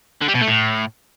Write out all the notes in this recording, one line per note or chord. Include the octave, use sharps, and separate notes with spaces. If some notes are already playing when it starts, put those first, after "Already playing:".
D3
G3
B2
A3
A2